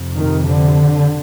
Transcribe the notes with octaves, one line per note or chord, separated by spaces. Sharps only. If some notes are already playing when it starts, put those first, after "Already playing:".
Already playing: F2 C3
D#3
D3